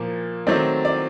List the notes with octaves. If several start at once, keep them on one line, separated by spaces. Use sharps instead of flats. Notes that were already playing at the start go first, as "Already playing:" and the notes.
Already playing: A#2 F3 A#3
D#3 F#3 A3 C4 D5
D5